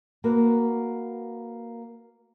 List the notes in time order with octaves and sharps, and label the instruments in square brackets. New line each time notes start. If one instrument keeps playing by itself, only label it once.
[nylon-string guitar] A#3 F#4 A#4 B4